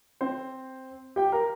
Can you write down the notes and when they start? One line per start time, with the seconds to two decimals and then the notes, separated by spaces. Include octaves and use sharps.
0.21 C4 C5
1.16 G4 G5
1.32 A#4 A#5